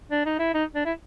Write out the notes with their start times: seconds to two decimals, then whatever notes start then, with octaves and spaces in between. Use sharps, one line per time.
0.11 D4
0.25 D#4
0.39 E4
0.54 D#4
0.75 D4
0.85 E4